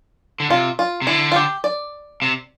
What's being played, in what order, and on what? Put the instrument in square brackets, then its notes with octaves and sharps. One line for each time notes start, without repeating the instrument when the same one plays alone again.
[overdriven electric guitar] D3
[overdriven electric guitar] C3 [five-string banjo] F4
[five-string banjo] F4
[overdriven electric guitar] C3
[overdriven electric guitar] D3 [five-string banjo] E4
[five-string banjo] F4
G4
D5
[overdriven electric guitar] C3